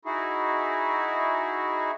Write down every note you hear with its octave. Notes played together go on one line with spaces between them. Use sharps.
D#4 E4 F#4 G#4